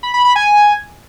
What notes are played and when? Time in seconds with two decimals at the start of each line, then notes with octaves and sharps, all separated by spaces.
0.03 B5
0.14 B5
0.25 B5
0.35 G#5